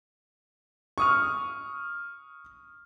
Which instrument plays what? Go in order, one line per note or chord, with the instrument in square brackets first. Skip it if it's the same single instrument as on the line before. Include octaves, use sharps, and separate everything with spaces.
[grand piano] C#6 D#6 F6